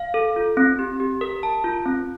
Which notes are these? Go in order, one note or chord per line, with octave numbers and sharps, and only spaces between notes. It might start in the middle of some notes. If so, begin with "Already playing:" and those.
Already playing: F5
A4
F4
C4
G4
G4
A#4
A5
F4
C4